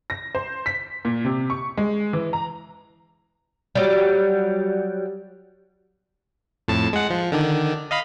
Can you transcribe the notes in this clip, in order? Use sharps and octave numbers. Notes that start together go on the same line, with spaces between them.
A#6
C5
B6
A#2
C3
C#6
G#3
E3
A#5
F#3 G3
F2 A2 A5
G#3 F#5
F3
D3 D#3 D4
D#5 F5 B5